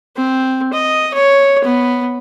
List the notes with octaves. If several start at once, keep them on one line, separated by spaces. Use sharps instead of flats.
C4
D#5
C#5
B3